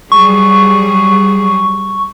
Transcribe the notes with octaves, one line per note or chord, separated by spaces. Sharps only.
F#3 G3 G#4 C#6